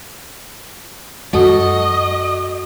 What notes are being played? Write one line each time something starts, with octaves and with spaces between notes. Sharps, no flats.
F#2 G#3 F#4 A4 D#5